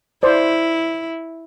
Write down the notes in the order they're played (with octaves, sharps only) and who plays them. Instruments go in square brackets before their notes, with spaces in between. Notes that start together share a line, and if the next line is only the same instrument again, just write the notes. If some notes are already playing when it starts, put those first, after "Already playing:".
[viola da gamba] E4 [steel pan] C5 D5